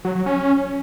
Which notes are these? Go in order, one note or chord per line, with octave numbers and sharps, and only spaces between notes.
F#3
F#3
C#4